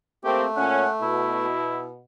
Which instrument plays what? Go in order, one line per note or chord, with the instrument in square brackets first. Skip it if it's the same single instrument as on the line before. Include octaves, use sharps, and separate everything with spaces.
[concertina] A3 [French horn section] A#3 C4 [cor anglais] G4
[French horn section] A#2 C#4 [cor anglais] F#5
[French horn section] B2 [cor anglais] E4